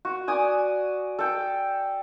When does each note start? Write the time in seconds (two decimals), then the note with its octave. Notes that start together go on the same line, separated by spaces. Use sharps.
0.05 F#4
0.28 D5 G#5 D#6
1.19 A4 G5